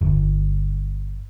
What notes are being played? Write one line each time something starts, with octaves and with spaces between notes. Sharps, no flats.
G1